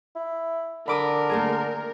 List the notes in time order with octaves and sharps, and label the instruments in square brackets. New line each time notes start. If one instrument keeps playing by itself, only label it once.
[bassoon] E4
[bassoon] D3 [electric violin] A#4 [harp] B5 D6 D#6
[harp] A3 A#3 G#4